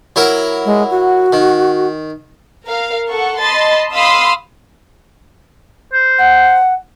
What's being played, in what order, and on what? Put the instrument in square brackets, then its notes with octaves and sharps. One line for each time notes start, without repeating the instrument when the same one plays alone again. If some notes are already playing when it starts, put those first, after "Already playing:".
[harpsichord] F#3 E4 A#4
[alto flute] G#3
F#4
[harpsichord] D#3
[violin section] A#4 F5
A4 F#5 C#6
D#5 A5 B5 C6 A6
F5 B5 C6 D#6 E6
[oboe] C5
[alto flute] F#5